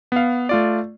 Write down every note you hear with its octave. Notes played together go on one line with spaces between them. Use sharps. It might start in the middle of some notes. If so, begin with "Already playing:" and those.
B3 F5
A3 F4 D5